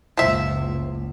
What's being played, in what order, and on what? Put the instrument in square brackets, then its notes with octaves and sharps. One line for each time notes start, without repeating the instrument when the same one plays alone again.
[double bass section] F#1 C#2 [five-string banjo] F3 E5